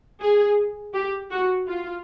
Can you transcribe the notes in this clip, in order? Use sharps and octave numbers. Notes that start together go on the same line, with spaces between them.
G#4
G4
F#4
F4